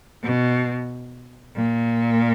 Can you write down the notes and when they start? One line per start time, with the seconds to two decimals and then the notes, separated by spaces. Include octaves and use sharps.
0.24 B2
1.56 A#2